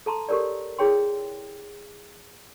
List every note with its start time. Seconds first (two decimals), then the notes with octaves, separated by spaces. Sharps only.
0.06 A4 A5 A#5 C6
0.29 G4 A4 A#4 C#5 D5
0.78 E4 G#4 C#5 G5 C6